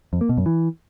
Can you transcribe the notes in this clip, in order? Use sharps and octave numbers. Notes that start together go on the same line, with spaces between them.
F2
A#3
B2
F#2
E3